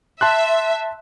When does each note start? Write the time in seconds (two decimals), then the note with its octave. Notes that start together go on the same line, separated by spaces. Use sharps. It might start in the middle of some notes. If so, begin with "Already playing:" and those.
0.21 E5 A5 C6 F#6